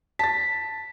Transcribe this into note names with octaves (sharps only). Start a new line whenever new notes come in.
A5 A6 B6